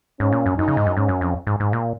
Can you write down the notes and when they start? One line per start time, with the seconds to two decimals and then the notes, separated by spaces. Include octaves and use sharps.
0.20 G#2 C#4
0.32 A#2
0.46 F#2
0.58 F#2 D#4
0.68 C#3
0.77 G#2
0.86 F#2
0.96 G#2 C#4
1.09 F#2
1.21 F2
1.47 G#2
1.60 G#2
1.73 A#2